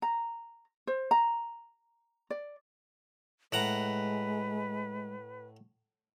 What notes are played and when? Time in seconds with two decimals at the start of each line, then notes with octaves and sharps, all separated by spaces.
0.02 A#5
0.87 C5
1.11 A#5
2.30 D5
3.52 A2 G#3 B4 F#5 A#5